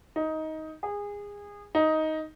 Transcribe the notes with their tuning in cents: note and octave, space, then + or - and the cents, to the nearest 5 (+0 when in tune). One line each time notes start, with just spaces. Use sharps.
D#4 +15
G#4 -25
D#4 +10